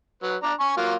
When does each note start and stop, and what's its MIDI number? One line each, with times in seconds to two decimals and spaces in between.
0.23 0.36 54
0.23 0.36 71
0.43 0.53 62
0.43 0.53 74
0.43 0.53 82
0.60 0.76 80
0.60 0.76 85
0.77 0.94 54
0.77 0.94 58
0.77 0.94 65